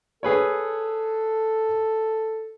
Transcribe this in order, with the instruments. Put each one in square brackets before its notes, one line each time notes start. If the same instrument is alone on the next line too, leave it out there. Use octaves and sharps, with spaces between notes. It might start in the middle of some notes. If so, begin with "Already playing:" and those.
[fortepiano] G#4 B4 C#5 [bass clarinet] A4